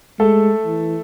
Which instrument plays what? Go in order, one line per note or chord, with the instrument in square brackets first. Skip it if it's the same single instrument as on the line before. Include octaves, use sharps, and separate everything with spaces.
[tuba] G#3 [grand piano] A3 A4
[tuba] E3